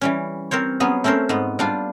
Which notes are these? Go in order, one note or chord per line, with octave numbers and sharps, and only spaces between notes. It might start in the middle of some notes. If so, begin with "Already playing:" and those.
E3 G3 C#4
C4 A#4 C5 C#5
F#3 B3 C#4 G#4
A3 C4 C#4 A#4 C5
G#2 B3
G3 D4 F4